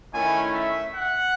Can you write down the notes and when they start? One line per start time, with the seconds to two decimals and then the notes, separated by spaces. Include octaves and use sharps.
0.13 D#3 A3 C#4 E4 G#5
0.54 E5
0.95 F#5